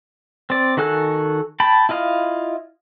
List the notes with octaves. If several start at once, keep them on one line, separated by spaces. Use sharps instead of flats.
C4 D5
D#3 F#4 A4 G#5 F#6
G5 A5 B5
E4 F4 D#5 F5